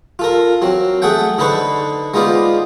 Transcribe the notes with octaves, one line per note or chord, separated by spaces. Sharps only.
F4 A4 A#4
F#3 C4
A3 G#4 A4 F#5 G5
D3 D#4 A4 B4 C5 C#6
G#3 B3 D#4 F4 C5 D5